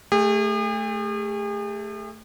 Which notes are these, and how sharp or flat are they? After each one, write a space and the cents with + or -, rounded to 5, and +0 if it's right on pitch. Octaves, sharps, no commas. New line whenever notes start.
A3 +0 G#4 -45